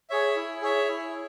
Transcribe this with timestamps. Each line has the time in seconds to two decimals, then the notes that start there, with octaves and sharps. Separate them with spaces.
0.10 G#4 C#5 E5
0.36 E4
0.62 G#4 C#5 E5
0.88 E4